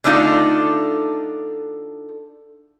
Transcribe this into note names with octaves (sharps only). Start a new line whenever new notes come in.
D3 A3 D4 D#4 F4 A4